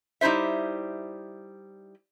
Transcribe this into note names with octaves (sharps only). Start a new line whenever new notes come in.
G3 D#4 E4 C5 E5